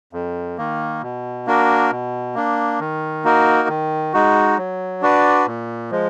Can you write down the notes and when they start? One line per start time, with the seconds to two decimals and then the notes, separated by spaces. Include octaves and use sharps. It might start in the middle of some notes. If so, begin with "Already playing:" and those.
0.13 F2
0.58 D#3 A#3
1.02 B2
1.47 A#3 D4 F#4 A#4
1.91 B2
2.35 A#3 D4
2.80 D#3
3.24 A#3 D#4 F#4 A#4
3.69 D#3
4.13 G#3 D#4 F#4
4.58 F#3
5.02 D4 F#4 B4 D5
5.46 A#2
5.91 F3 G#3